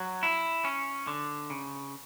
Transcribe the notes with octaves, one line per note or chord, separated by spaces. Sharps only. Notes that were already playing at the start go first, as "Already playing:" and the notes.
Already playing: F#3
E4
C#4
D3
C#3